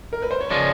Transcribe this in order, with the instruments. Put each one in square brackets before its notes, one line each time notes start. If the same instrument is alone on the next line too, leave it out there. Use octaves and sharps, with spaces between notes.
[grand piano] A#4
B4
C5
C#5
[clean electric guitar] C#3 F3 G#3 [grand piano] D5